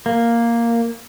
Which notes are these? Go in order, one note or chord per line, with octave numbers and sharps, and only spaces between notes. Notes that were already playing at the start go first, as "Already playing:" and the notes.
A#3